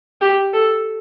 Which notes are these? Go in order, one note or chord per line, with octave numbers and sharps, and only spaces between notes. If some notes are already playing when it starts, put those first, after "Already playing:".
G4
A4